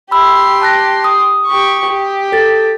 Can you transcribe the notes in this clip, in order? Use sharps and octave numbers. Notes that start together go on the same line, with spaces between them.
G4 B5 C6 E6
A5 F#6 A#6
D#6
G4 C#6
G4
A4 A6